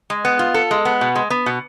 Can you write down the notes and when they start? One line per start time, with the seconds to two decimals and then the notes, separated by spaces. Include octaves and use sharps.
0.10 G#3
0.25 B3
0.39 F4
0.54 A4
0.71 G#3
0.85 B3
1.01 B2
1.15 G#3
1.30 B3
1.46 B2